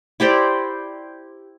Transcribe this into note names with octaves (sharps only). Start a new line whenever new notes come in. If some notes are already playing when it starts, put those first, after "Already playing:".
E4 G4 C5 D5